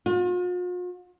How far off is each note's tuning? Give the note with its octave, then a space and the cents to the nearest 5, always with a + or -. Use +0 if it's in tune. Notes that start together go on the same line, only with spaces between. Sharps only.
F4 +45